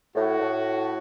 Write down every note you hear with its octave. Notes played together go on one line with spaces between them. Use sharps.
A2 F#4
A2